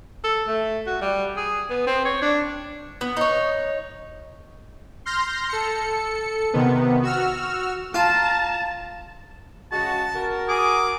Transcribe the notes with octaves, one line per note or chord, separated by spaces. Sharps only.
A4
A3
F#4
G3
G#4
B3
C4
C#5
D4
B3
D#4 C#5
C6 F6 G6 A#6
A4 C#7
C3 D#3 B3
F#4 E6 F6
F4 A5 A#5
C#3 G#3 F#4 A5
F#4 A#4
G#4 D6